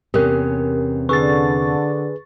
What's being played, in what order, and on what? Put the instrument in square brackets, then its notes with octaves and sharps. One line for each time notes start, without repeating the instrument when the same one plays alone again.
[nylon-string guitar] E2 C3 C#4 [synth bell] G4 A#4
[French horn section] D3 [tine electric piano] G#4 B4 [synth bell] C#6 A6